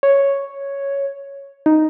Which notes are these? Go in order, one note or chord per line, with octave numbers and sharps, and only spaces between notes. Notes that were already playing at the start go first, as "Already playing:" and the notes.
C#5
D#4